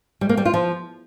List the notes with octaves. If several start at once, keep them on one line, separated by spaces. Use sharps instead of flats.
G3
A#3
G3
F4
F3